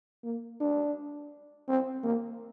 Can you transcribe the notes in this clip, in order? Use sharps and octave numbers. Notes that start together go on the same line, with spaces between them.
A#3
D4
C4
A#3